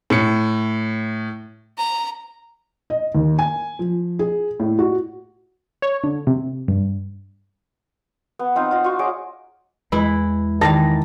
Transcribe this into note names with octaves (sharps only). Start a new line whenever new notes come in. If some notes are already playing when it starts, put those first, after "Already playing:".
A2 C#7
A#5
D#5
D#2
G#5
F3
G#4
A2
F#4
C#5
D3
C3
G2
B3
C4 D#4 F4 F#5
F4 D#5
F4 F#4 C#6
G#4 C#5 D#5 D6
E2 E3 G#3 E4
D#3 E3 D5 F5 A5 A#6